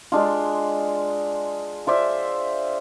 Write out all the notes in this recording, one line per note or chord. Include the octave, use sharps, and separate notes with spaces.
G#3 D4 F4
F4 C5 D5 E5